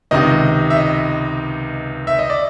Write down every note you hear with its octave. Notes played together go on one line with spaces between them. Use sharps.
C#2 C3 D#3 D#5
E5
D#5
E5
D#5
D5